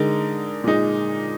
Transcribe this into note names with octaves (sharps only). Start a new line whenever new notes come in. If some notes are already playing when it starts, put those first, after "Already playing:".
Already playing: D3 G#3 D#4 A#4
A#2 G#3 D#4